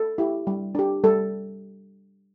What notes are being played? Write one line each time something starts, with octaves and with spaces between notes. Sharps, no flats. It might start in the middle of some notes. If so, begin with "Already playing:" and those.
Already playing: A4
E4 G4
G3
D4 G4
G3 A4